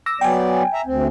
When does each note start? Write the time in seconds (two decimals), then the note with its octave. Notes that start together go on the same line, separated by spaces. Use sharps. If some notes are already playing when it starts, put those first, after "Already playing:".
0.06 D6 E6 A#6
0.21 F#3 B3 D5 G5 G#5
0.74 E5 A#5
0.86 D2 C4